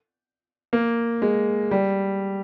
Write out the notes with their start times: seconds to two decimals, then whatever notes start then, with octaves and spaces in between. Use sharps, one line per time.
0.73 A#3
1.22 G#3
1.71 G3